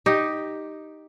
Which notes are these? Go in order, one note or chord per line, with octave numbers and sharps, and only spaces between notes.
D#4 G4